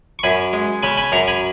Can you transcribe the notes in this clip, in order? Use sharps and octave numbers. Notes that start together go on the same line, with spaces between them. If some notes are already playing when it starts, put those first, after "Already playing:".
C#6
F#2 G#5 B5
G#3
C#3 G#5 B5
G#5 B5
F#2 A#5 C#6
G#5 B5